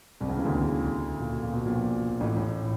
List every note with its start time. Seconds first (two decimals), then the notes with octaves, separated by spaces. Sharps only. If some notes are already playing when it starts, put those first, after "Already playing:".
0.20 C2 C3
0.28 C#2 C#3
0.37 E2 E3
0.45 D2 D3
1.20 A#2
1.31 B2
1.43 A#2
1.53 B2
1.65 A#1 A#2
2.20 A1 A2
2.37 A1 A2